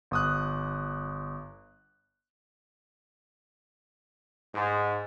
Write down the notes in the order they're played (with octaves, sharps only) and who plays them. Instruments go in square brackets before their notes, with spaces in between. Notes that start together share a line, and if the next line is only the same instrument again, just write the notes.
[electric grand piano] G1 D#6 F#6
[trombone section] G#2